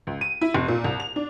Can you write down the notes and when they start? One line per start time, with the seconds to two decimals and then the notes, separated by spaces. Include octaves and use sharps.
0.07 C#2
0.21 D#7
0.41 E4
0.54 F1
0.68 A#2
0.85 C2
1.00 F7
1.16 D4